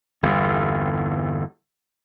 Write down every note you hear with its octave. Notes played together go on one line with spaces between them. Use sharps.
G1 E2